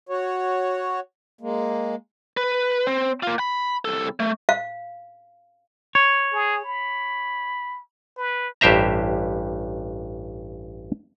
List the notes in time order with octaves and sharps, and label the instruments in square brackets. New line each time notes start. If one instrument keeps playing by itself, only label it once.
[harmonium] F#4 C#5
G#3 A#3
[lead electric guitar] B4
C4
A#3 F4
B5
C2 A4
A3
[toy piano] F5
[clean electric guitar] C#5
[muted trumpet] G#4
B5
B4
[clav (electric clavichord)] A1 G2 G4 C5 E5 A#5